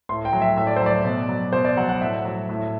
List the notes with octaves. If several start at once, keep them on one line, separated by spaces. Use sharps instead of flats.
A2 C6
G5
F#3
E5
A2 E5
D5
C5
F#3 D5
B2
F#3
B2 C5
D5
F#3 F#5
F#5
A2 E5
F#3
A2